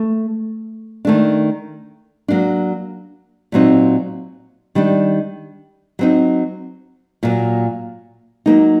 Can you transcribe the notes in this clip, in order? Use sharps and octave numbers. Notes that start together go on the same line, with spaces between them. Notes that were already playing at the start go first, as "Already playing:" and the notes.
Already playing: A3
D#3 A3 D4
F#3 A#3 D4
A#2 F#3 C4 D#4
D#3 G3 D4
F#3 C4 D#4
A#2 F#3 A#3
F#3 A#3 D#4